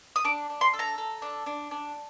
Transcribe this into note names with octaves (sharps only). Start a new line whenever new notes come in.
D#6
D4 D6
D4
C6
A4
A#5
A4
D4
D4
D4